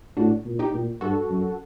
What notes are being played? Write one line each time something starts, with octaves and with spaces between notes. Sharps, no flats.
A2 D4 F#4
A#2
D#4 G4
A#2
G2 F#4 A4
F#2